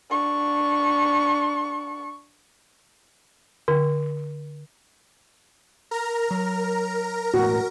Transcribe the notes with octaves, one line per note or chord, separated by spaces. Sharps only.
D4 C#6
D3
A#4 A#5
F#3
E1 A2 F#4